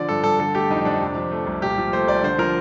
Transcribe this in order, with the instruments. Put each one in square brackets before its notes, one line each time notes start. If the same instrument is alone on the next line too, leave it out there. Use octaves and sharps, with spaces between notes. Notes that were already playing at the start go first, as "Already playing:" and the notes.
Already playing: [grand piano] D3 F3 D5
G2 A4
G2 A4
D3 A4
A3 G4
F2 D#4
F2 D4
C3
F3
A3
C2
A#2 G4
F3
A3 C5
C2 D5
D3 C5
F3 A#4